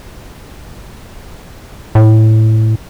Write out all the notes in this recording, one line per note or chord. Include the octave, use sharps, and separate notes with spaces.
A2